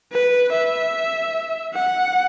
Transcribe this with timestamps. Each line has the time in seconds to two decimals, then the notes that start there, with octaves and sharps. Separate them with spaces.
0.12 B4
0.52 E5
1.74 F#5